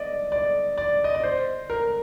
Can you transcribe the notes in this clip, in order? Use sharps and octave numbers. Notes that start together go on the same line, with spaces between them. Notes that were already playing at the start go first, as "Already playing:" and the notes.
Already playing: D5 D#5
D5
D5
D#5
D5
C5
A#4